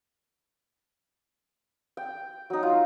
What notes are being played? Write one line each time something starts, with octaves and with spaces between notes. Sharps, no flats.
G5
F#3 D#4
F4